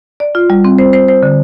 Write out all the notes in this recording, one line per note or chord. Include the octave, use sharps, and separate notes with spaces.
D5
F4
G3
C4
C5
C5
C5
D3